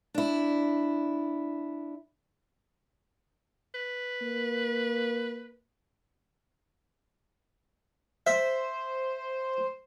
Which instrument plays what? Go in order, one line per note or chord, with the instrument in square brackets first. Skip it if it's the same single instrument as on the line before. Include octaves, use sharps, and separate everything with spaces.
[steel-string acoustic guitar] D4 E4
[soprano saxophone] B4
[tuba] A#3
[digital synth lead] C5 [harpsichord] E5